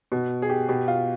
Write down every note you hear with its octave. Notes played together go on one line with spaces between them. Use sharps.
B2
G#4
G4
B2 G4
F4